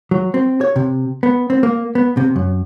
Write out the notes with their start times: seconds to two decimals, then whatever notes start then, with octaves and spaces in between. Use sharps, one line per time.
0.11 F#3
0.34 C4
0.61 C#5
0.76 C3
1.23 B3
1.50 C4
1.63 A#3
1.95 B3
2.17 C3
2.36 F#2